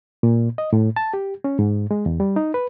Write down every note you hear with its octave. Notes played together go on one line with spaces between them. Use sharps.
A#2
D#5
A2
A5
G4
C#4
G#2
G#3
E2
G3
D#4
B4